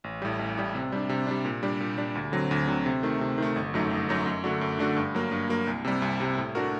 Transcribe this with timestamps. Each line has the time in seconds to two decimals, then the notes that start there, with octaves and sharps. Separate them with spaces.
0.04 A1
0.22 A2 G3
0.39 A1
0.57 A2 G3
0.75 C3
0.92 G3 D4
1.09 C3
1.27 G3 D4
1.45 A#2
1.63 G3 D4
1.80 A#2
1.98 G3 D4
2.15 D2
2.32 D3 F#3 C4
2.51 D2
2.67 D3 F#3 C4
2.86 C3
3.03 D#3 A3
3.21 C3
3.38 D#3 A3
3.56 G1
3.74 F#2 F#3 A3 D#4
3.91 G1
4.09 F#2 F#3 A3 D#4
4.26 F#2
4.44 D3 A3 D4 F#4
4.61 F#2
4.79 D3 A3 D4 F#4
4.96 G2
5.15 F#3 A#3
5.31 G2
5.49 F#3 A#3
5.67 C2
5.85 C3 G3
6.02 C2
6.20 C3 G3
6.37 A2
6.55 A3 D4 F#4 A#4